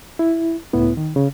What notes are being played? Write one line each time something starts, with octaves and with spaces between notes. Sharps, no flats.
E4
C#2 A2 B3 E4
D#3
C#3